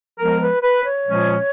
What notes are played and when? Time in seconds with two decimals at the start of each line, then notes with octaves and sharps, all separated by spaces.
0.19 F3 G#3 B3 A#4
0.41 B4
0.63 B4
0.84 C#5
1.06 A#2 F3 G#3 C#4